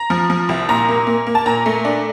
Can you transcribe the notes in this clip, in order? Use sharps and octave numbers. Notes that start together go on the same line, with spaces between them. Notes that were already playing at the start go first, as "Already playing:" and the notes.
Already playing: A#5
F3
F3
C2
A#2 A#5
A#3
A#3
A#3
A5
A#2 A#5
A3
D4